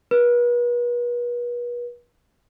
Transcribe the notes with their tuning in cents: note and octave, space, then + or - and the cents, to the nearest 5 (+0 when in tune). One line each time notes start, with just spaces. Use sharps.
B4 -40